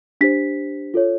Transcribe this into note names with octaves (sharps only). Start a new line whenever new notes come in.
D4 G4 C5 B6
F4 A4 C#5